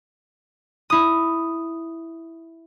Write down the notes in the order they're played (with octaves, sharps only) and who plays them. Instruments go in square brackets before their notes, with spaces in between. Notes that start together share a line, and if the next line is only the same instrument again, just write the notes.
[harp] E4 D#6